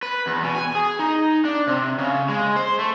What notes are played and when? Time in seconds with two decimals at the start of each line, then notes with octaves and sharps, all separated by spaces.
0.03 B4
0.27 E2
0.43 B2
0.55 G#5
0.75 G#4
1.00 D#4
1.45 D4
1.67 C3
1.99 C#3
2.29 G#3
2.56 C5
2.79 A3